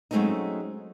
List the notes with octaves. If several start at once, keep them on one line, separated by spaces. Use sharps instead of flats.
F#3 G#3 A3 C4 C#4 D#4